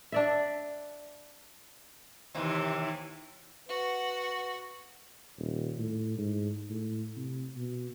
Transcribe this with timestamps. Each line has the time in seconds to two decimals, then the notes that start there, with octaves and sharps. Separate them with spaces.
0.12 D4 D5 E5
2.35 D#2 C3 E3
3.69 F#4 B4 F#5
5.38 D#1
5.78 A2
6.18 G#2
6.70 A2
7.16 C3
7.56 B2